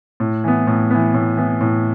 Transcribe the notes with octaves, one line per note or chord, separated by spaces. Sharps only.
A2
E3 B3
A2
E3 B3
A2
E3 B3
A2